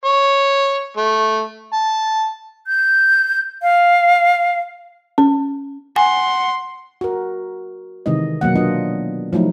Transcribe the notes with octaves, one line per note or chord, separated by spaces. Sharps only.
C#5
A3
A5
G6
F5
C#4
F#5 G#5 C6
F#4 A#4
C3 D#3 E3 G#3 D#5
B2 F#3 A#3 F#5
B3 D4 F4 D#5
F3 F#3 A3 D#4 E4